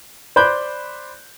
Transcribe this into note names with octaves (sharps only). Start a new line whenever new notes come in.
C5 D5 B5 D6 F#6 G6